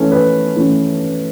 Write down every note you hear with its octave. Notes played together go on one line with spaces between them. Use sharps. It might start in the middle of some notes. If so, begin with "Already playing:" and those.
Already playing: E3 A3 C#4
B4
E3 A3 C#4